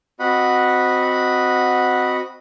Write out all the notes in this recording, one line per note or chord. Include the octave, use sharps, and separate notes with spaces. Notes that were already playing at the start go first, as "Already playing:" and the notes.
C4 F#4 D#5 F#5 B5